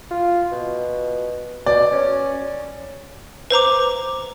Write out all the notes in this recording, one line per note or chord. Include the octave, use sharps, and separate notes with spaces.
F4
B2
B2 D5
C#4
B4 C5 A#5 D6